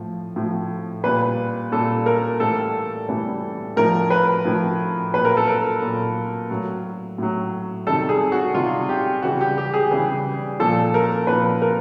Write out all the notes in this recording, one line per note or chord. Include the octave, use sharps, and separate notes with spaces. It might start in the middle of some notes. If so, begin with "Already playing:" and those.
Already playing: A2 F3
A2 F3
A#2 G3 B4
A#2 G3 A4
A#4
A2 E3 G3 A4
A2 E3 G3
A2 F3 A#4
B4
A2 F3
A#2 F#3 B4
A#4
A4
A#4
A#2 F#3
A2 F#3
A2 F#3
C3 D#3 G3 A4
G#4
F#4
C3 D#3 G3 F4
G4
C#3 E3 G3 F#4
G4
G4
G#4
C#3 E3 G3
A#2 F3 A4
A#4
A#2 F3 B4
A#4